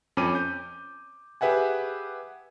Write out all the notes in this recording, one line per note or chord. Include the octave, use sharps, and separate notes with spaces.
F2 C#4 D6 D#7
G6
G4 G#4 B4 E5 F#5 G#5